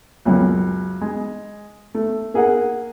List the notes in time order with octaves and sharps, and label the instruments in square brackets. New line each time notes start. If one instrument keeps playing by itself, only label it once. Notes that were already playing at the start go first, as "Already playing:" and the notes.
[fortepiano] C#2 F#2 B2
G#3
A3
A#3 G#4 A#4 F#5